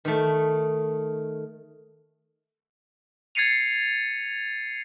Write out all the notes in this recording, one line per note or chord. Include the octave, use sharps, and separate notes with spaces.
D#3 A3
G#6 A6 C7 C#7 D#7 F7